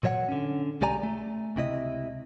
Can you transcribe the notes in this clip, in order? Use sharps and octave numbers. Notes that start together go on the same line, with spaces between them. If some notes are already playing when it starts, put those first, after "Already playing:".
A#2 F#3 C#5 E5 F#5
D3 C#4
B1 G#3 G4 D5 G#5 A#5
A3
C#2 C3 E4 D#5